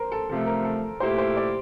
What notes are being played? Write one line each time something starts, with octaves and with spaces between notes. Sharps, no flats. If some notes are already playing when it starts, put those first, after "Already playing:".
Already playing: A#4 C5
A4
C3 F3 A3 A4
A#4
A4
A#2 A3 E4 G4 C5
C5
D5